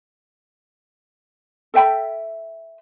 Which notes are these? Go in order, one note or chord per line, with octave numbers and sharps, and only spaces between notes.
A4 E5 G5 B5